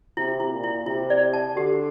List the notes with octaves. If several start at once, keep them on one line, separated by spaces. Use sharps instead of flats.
C3 E4
E4
A#2
E4
C3 E4
D5
A5
D3 G4